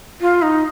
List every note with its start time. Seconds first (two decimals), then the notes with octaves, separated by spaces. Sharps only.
0.21 F4
0.42 D#4